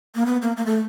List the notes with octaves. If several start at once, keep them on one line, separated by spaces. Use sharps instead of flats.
A#3
B3
A#3
A#3
A3